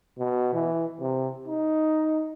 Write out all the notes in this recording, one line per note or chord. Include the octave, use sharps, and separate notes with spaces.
B2
E3
C3
D#4